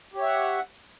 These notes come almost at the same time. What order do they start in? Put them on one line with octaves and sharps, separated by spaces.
G4 C#5 E5 F#5